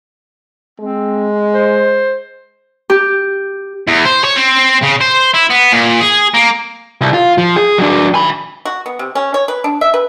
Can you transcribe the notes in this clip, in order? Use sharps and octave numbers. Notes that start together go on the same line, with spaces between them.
G#3 C4
C5
G4
E2
C5
C#5
C4
C#3
C5
E4
B3
A#2
G#4
A#3
C2
F4
F3
G#4
F#3 D4
G#5 B5
F#4
B3
C3
C#4
C#5
B4
D4
E5
B4